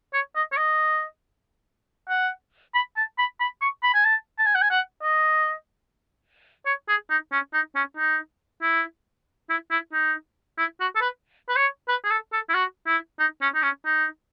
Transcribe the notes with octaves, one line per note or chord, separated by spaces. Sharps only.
C#5
D#5
C#5
D#5
F#5
B5
A5
B5
B5
C#6
B5
G#5
A5
A5
G#5
F#5
G#5
F#5
D#5
C#5
G#4
D#4
C#4
D#4
C#4
D#4
E4
E4
E4
D#4
E4
F#4
A4
B4
B4
C#5
B4
G#4
A4
A4
E4
F#4
E4
D#4
C#4
D#4
C#4
D#4